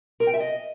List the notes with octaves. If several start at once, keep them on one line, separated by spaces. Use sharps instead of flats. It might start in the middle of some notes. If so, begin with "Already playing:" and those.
A#4
G5
E5
D#5